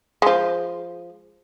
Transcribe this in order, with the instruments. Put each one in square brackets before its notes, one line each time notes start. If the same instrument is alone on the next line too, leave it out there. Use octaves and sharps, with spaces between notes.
[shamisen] F3 G#3